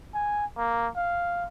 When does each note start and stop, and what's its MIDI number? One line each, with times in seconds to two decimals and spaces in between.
0.15 0.46 80
0.58 0.89 58
0.96 1.47 77